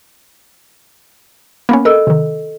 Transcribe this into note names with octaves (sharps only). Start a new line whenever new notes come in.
A#3 B3 C#4 B5
A4 A#4 D#5 E6
C3 D#3